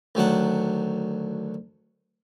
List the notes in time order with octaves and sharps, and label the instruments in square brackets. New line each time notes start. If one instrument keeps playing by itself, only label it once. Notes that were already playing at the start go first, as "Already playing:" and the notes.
[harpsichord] D2 D#3 F#3 D4 F#5